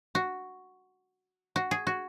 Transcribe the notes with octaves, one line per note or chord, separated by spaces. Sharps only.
F#4
F#4
G#4
F#4